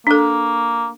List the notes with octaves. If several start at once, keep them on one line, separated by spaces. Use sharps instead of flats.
A#3 D4 A4